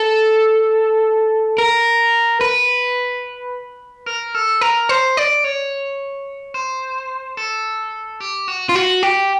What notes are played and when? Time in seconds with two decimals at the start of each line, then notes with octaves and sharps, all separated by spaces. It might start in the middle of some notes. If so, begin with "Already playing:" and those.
Already playing: A4
1.58 A#4
2.41 B4
4.06 A#4
4.35 A4
4.61 A#4
4.89 C5
5.17 D5
5.44 C#5
6.54 C5
7.37 A4
8.20 G4
8.48 F#4
8.69 F4
8.75 F#4
9.03 G4